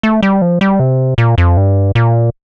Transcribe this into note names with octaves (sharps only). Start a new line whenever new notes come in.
A3
G3
F3
G3
C3
A#2
F2
G2
A#2